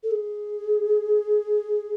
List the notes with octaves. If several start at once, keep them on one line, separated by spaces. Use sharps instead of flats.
A4
G#4